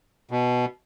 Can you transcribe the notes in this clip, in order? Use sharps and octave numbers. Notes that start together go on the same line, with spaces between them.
B2